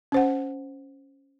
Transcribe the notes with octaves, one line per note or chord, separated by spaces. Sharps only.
C#4 C5 F#5